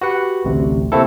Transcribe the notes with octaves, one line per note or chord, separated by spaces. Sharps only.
F#4 G4 B4 F#5
A1 D2 C3
C3 A3 A#3 C4 E4 A4